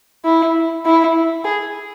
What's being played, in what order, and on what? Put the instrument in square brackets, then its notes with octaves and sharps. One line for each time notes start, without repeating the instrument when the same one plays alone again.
[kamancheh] E4
E4
G#4